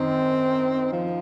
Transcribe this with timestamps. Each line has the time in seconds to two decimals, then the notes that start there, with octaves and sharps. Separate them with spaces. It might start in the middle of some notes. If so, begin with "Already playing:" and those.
Already playing: F#2 D#3 C4 D#4
0.92 F3